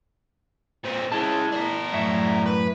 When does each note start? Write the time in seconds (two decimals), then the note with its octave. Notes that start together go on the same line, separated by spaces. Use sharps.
0.85 A#2 C4
1.12 G#3 C#4 E4 A5
1.52 D4 A#4
1.93 F#2 A2 E5
2.46 B4